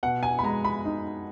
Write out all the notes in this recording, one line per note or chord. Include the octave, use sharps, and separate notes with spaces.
B2 F#5
G#5
B5
G#3 A#5
B5
D#4